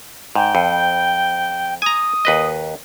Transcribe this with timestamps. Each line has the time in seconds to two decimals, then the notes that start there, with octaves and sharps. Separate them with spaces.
0.35 G#2 G5
0.55 F2
1.82 G#5 A#5 D#6
2.25 D#2 B4 D#5